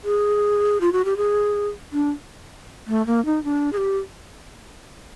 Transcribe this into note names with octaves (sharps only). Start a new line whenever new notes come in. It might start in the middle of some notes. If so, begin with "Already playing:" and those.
G#4
F4
F#4
G4
G#4
D4
A3
A#3
D#4
D4
G#4
G4